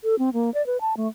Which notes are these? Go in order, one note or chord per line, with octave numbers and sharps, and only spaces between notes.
A4
C4
A#3
D5
B4
A5
A3